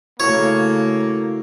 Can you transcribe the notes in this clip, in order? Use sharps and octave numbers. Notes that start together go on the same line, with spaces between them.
C#3 A3 A#3 E4 F#4 A4 C#5